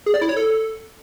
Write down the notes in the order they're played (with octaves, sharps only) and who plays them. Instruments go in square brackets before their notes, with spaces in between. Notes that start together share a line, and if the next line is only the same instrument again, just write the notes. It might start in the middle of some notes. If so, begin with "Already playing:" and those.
[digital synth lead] G#4
D5
E4
C#5
A4